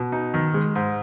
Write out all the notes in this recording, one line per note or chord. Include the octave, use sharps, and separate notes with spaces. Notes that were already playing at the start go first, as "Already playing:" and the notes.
Already playing: B2
D#4
D#3
G#3
G#2